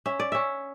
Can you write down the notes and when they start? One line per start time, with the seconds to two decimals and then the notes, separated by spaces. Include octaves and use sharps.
0.06 C#4 E5
0.20 D5
0.32 C#4 E5